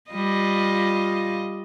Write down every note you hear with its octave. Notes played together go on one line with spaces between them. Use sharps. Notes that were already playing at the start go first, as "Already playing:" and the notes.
G3 F4 D#5